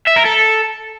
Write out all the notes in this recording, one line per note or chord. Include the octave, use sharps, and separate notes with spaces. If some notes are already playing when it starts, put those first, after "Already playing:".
E5
A#4
A4